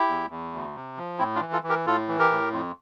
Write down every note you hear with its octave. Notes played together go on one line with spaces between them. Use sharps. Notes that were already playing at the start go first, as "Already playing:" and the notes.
Already playing: E4 G4
E2
E2
D2
C3
F3
A2 C4 E4
D4 F4
E3
F4 A4
E3
G4 A#4
A2 F4 A4
E3
G4 A#4
A2
F2